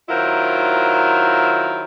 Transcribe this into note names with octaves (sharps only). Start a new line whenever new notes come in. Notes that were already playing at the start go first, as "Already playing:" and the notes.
D#3 F#3 E4 F4 A#4 C5